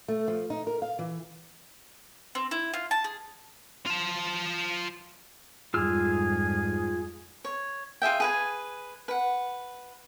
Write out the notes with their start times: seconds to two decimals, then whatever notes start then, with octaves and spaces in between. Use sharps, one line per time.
0.08 A3
0.28 F3
0.50 D#4
0.67 A#4
0.82 F5
0.99 E3
2.35 C4
2.51 E4
2.73 F4
2.91 A5
3.04 G#4
3.86 F4 A5
5.74 F2 G#2 G3 F4 G#4 E6 F6
7.45 C#5
8.02 F4 G#4 E5 G5
8.20 G#4 B4 G#5
9.08 B4 F#5